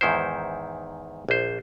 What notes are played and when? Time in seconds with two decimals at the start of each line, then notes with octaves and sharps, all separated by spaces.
0.01 E2 G#2 D#3 E4 C5
1.29 A#1 C5